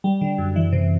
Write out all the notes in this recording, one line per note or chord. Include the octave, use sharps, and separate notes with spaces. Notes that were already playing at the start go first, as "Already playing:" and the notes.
G3
D3
F#2
E3
C3